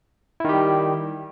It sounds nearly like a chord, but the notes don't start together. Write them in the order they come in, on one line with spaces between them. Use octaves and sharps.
E4 D#3 G4 G3